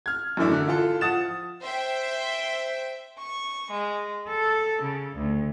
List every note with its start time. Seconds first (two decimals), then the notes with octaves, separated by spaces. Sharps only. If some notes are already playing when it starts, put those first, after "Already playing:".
0.06 F6 G#6
0.37 F#2 E3 A3 D4 E4
0.52 D3
0.68 E4 F4 A4
1.01 F3 F#5 D#6 A6 E7
1.62 C5 E5 G5
3.18 C#6
3.70 G#3
4.27 A4
4.81 C#3
5.15 D2